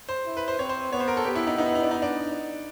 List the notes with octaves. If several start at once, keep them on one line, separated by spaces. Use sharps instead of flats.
C5
E4
B4
C5
C4 C#5
C5
B3 C#5
C5
A#4
A4
B3 G4
E4
D#4
B3 D#4
E4
D#4
D4
D#4
D4